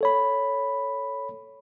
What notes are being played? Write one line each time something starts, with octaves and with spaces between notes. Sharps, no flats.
A4 C#5 B5